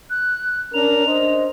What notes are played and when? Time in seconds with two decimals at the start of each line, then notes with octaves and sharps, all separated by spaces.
0.10 F#6
0.74 C#4 D4 A#4 F7
1.07 D4 C5 D#5